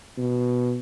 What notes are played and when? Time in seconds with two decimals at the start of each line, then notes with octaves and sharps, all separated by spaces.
0.18 B2